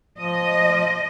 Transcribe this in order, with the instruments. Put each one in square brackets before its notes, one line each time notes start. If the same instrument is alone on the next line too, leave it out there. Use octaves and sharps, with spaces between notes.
[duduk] F3 [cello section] D#5